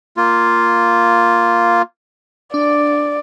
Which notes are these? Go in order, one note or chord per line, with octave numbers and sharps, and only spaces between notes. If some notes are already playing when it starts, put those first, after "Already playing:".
A#3 F4
D4 D5